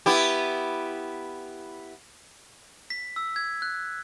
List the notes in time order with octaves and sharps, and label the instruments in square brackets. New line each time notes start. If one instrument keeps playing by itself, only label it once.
[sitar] B3 E4 G4
[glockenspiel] B6
E6
G#6
F#6